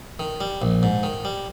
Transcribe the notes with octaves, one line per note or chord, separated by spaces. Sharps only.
D#3
G3
A#1
G#2
D#3
G3